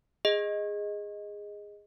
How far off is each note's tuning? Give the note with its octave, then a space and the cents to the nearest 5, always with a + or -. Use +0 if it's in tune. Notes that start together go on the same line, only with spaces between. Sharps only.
G#4 -15 D#5 +0